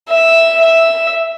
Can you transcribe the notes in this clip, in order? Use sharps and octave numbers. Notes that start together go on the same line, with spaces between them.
E5
E5